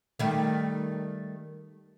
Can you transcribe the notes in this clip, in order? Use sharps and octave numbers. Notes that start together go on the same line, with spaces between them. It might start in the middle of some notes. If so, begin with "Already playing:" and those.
D#3 G3 A3